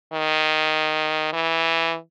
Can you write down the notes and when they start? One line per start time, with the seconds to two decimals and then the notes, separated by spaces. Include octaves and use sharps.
0.13 D#3
1.33 E3